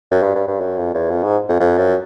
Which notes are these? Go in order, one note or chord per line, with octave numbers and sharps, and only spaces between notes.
F#2
G2
G2
G2
F#2
F2
E2
F2
G#2
F2
F2
F#2